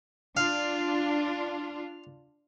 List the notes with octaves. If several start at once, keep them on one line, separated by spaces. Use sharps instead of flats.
D4 F4 F5